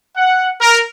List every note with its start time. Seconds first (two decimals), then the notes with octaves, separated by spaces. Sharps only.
0.17 F#5
0.61 A#4